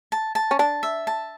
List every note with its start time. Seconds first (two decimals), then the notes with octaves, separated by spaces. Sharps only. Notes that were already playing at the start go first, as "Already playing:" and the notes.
0.12 A5
0.35 A5
0.51 C#4
0.59 D4 A5
0.83 E5
1.07 A5